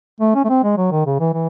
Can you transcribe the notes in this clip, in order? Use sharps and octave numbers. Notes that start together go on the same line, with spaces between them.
A3
C#4
A3
C4
G#3
F#3
D#3
C#3
E3
E3